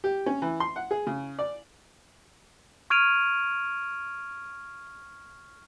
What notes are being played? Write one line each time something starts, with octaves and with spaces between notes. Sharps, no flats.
G4
C#4
E3
C6
F#5
G#4
C#3
D5
C#6 F6 G#6 D7 D#7 F7